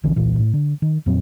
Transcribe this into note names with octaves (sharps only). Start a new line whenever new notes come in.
A#1 D3 E3 C#4
E1 C2 A#2 E3
A2
D3
D#3
F2 A#2 F#3 C4